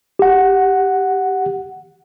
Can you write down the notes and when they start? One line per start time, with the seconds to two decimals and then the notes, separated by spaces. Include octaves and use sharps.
0.19 G4 F#5